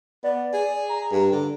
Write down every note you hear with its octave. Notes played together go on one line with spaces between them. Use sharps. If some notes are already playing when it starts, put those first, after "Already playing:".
B3 D5
G#4
A#5
G2
D3